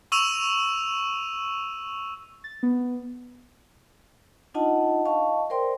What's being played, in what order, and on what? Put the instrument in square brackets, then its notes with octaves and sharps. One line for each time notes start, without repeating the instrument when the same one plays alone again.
[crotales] C#6 E6 D#7 F7
[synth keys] A6
B3
[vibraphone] D4 D#4 F4 D#5 F#5 A5
D#5 F5 A5 C#6
A#4 C5 D5 G5 C6